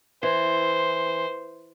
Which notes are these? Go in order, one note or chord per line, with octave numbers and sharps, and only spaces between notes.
E3 C5